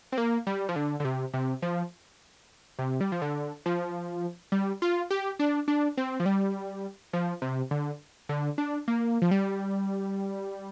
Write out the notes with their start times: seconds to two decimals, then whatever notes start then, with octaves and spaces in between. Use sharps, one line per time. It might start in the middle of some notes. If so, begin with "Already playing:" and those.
0.12 C4
0.18 A#3
0.47 G3
0.69 F3
0.76 D3
1.00 D3
1.05 C3
1.34 C3
1.62 F3
2.79 C3
3.01 G3
3.12 F3
3.22 D3
3.66 F3
4.52 G3
4.82 F4
5.10 G4
5.39 D4
5.68 D4
5.97 C4
6.20 F3
6.26 G3
7.13 F3
7.42 C3
7.71 D3
8.29 D3
8.58 D4
8.88 A#3
9.22 F3
9.31 G3